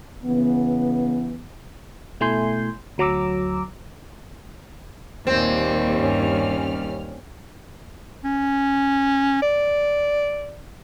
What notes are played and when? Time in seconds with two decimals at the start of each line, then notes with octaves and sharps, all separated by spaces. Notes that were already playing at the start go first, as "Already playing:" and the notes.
0.24 C#3 E3 B3
2.20 B2 A3 E4 G#5 C6 G6
2.98 D2 F#3 A#5 D6 E6
5.27 D#2 A#2 G3 C4 G#5
5.96 G2 C#4 F6
8.24 C#4
9.42 D5